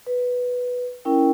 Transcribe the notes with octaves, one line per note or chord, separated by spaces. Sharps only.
B4
C#4 E4 A#4 G5